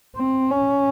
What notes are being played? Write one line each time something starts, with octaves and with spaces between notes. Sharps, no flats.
C4
C#4